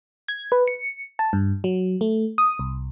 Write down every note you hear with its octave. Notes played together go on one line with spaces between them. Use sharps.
G#6
B4
C#7
A5
G2
F#3
A3
D#6
C2